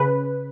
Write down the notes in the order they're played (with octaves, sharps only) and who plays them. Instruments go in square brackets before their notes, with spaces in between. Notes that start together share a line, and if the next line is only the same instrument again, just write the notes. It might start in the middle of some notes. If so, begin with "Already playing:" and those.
Already playing: [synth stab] C#3 B4